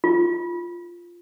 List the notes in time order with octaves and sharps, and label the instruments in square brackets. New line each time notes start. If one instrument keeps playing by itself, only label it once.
[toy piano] F4